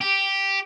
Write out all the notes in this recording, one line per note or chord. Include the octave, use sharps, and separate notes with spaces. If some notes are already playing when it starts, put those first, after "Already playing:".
G4